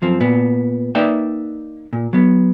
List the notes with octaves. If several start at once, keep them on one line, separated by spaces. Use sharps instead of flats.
F#2 F3 C4
A#2 B3
A#3 D#4 B4 D5 E5 G5
A#2
F#3 B3